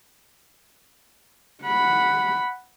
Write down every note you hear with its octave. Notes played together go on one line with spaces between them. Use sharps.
F#5 B5